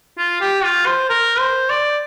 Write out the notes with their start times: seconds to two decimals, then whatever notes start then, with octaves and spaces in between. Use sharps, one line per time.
0.18 F4
0.41 G4
0.64 F4
0.86 C5
1.09 A#4
1.39 C5
1.69 D5